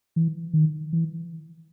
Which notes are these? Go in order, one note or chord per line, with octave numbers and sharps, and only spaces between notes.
E3
D#3
E3